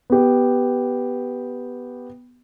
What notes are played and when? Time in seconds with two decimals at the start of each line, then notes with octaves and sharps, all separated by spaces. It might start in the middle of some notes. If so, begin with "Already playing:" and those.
0.10 B3 G4